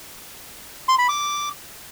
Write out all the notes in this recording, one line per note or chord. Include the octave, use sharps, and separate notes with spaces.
C6
B5
D6